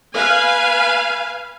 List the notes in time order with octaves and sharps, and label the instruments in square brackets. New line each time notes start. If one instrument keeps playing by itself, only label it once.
[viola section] B4 F5 G#5